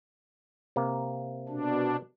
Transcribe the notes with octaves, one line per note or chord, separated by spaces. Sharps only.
C3 A#3
B2 D4